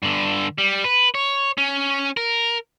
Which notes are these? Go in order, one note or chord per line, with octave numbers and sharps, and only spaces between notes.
G2 D3
G3
B4
C#5
C#4
A#4